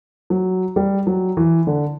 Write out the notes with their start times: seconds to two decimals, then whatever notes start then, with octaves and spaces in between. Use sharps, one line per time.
0.30 F#3
0.76 G3
1.07 F#3
1.37 E3
1.67 D3